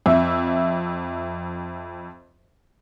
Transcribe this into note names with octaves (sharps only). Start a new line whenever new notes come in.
F2 E5